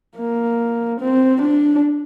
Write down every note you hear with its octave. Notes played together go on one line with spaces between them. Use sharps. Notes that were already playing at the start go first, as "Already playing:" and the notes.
A#3
C4
D4